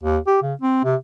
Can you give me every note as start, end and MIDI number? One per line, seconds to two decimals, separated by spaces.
0.03 0.18 39
0.27 0.38 67
0.42 0.54 49
0.61 0.81 60
0.84 0.95 48